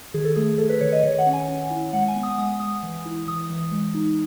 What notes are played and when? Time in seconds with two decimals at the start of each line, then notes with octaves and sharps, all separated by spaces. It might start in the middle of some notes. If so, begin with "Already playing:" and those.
0.14 D#3 G#4
0.25 A4
0.36 A3 G#4
0.58 A3 A4
0.70 B4
0.81 D#3 C#5
0.92 D#5
1.03 D#3 C#5
1.19 F#5
1.26 C#4
1.33 G#5
1.48 C#4
1.70 E4
1.93 G#3 F#5
2.08 G#5
2.16 B3
2.23 D#6
2.38 G#3 D#6
2.60 G#3 D#6
2.83 E3
3.05 E4
3.27 E3 D#6
3.50 E3
3.72 G#3
3.94 D#4